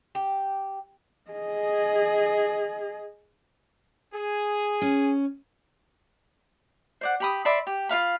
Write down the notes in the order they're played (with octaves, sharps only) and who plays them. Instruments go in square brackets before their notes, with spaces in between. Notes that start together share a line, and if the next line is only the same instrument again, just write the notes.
[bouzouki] G4
[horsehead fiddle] G#4 D#5
[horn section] G#4
[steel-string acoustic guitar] C#4
[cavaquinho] C5 D5 F#5
G4 B5 D#6
D5 E5 B5 C6
G4
F4 C#5 F5 B5